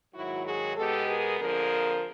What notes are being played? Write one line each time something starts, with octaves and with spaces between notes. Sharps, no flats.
G#2 D#3 F#3 E4 F#4
F#4 G#4
B2 G#3 B3 G4 A4
G#4 A#4
F2 D3 F3 A#3 G#4 A#4